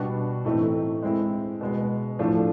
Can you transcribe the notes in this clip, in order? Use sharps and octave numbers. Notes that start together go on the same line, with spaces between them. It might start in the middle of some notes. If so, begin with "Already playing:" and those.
Already playing: B2 G3 B3 D4 F#4
A2 E3 A3 C4 D#4
G#3 C4 E4
B2 G#3 B3
A2 F3 A3 D4